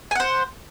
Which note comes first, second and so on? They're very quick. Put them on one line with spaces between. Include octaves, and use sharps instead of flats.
G#5 F#5 C5